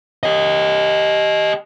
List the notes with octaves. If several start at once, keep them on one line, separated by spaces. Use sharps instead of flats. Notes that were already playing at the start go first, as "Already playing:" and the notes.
G4 D#5